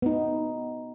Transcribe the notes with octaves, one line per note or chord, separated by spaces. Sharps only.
B3 D#4